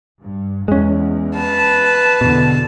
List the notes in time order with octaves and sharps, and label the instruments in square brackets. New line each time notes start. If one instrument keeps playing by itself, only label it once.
[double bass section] G2
[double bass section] E2 [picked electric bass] G#3 C#4
[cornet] B4 [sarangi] A5
[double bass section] E2 D3 [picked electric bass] B2